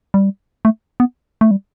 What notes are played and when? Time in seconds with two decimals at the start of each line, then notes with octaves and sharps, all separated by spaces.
0.14 G3
0.65 A3
1.00 B3
1.41 A3
1.51 G3